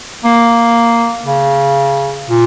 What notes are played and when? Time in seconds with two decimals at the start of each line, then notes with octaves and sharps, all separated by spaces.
0.24 A#3
1.26 C#3
2.28 A#2